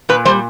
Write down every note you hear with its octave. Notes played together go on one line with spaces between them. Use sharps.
A#2 B4
G3 C5